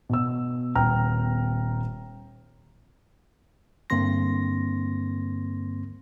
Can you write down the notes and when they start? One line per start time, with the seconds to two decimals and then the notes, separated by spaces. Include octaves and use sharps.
0.09 B2 E6
0.75 D#1 B3 G5 A#5 F6
3.90 G2 D3 A#3 C4 C6 A#6